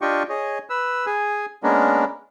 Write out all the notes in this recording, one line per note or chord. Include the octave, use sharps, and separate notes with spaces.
D4 F4 G4 D#5 G5 C#6
G#4 C#5 D#5
B4 E6
G#4 G#5
G#3 A#3 B3 C#4 D4 A#4